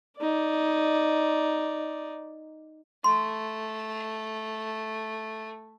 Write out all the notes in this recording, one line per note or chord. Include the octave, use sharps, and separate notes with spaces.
D#4 D5
A3 C6